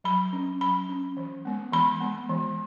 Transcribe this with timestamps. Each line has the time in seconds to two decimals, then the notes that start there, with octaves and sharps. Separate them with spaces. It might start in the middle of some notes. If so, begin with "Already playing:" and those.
0.04 F#3 B5
0.33 C#4
0.61 F#3 B5
0.89 C#4
1.17 E3
1.45 G#3 B3
1.73 E3 B5
2.01 G#3 B3
2.30 E3